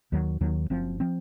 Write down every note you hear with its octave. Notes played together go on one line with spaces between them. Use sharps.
D#2 D#3 F#3
D#2 D#3 F#3
F#1 F#2 F3 C4
F3 C4